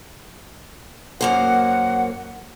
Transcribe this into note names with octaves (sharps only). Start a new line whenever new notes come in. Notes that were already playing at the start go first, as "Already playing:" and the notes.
F#2 A#3 C5 F#5